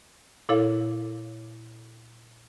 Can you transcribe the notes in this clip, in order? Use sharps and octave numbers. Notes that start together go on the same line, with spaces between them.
A#2 E4 A4 C#5 F5